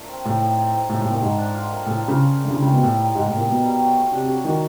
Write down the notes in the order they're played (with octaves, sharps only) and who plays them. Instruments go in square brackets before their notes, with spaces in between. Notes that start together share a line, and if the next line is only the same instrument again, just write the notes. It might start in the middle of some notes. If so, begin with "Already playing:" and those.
Already playing: [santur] A3 A#3 D4 F4
C4
[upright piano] A2 [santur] D#4
[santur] A3
A3
C4
[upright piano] A2 [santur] D#4
[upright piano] A2
[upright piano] A#2 [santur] A3
[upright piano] G#2 [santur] A4
[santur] D4
F4
A#3
[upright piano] A2 [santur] A4
[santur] D4
[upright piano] C#3
[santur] F4
A#3
[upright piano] D3
[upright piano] C#3 [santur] G3
[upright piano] C#3
[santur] A#3
[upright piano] B2
[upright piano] A2 [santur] D#4
[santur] G3
[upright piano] G#2 [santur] G3
[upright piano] A2
[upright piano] A#2 [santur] A#3
[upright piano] B2 [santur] D#4
[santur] G3
F#3
A3
[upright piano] C3 [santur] D4
[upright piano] C3
[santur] F#3
[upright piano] D#3 [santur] F#3